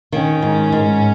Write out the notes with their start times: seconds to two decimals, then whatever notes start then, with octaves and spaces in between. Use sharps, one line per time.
0.12 D#3 C#4
0.42 G#2
0.72 G#2